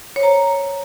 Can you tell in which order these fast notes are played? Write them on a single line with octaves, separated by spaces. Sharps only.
C#5 C5 A#5